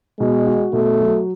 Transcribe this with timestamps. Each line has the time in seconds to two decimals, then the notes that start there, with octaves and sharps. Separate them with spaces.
0.19 B2 G#3
0.46 F#4
0.73 B2 A3
1.00 F#3